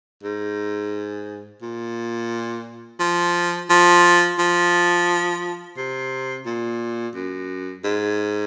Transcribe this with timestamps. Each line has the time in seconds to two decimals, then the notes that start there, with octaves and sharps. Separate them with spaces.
0.23 G#2
1.62 A#2
3.00 F3
3.70 F3
4.39 F3
5.77 C3
6.46 A#2
7.15 F#2
7.84 G#2